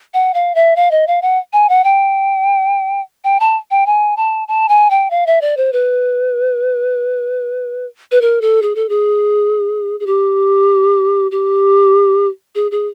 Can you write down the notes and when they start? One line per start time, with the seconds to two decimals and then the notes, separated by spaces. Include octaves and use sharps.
0.14 F#5
0.34 F5
0.55 E5
0.76 F5
0.91 D#5
1.07 F5
1.22 F#5
1.53 G#5
1.69 F#5
1.84 G5
3.24 G5
3.40 A5
3.71 G5
3.86 G#5
4.17 A5
4.48 A5
4.69 G#5
4.90 G5
5.11 F5
5.27 E5
5.41 D5
5.57 C5
5.73 B4
8.11 B4
8.21 A#4
8.41 A4
8.62 G#4
8.75 A4
8.89 G#4
10.00 G#4
10.07 G4
11.31 G4
12.55 G#4
12.71 G#4